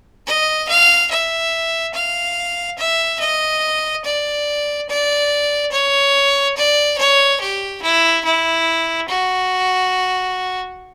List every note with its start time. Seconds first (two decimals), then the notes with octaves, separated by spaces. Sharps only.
0.26 D#5
0.68 F5
1.10 E5
1.94 F5
2.78 E5
3.20 D#5
4.05 D5
4.89 D5
5.72 C#5
6.56 D5
6.98 C#5
7.41 G4
7.82 E4
8.24 E4
9.08 F#4